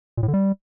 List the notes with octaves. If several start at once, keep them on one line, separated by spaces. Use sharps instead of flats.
A#2
A2
D3
G3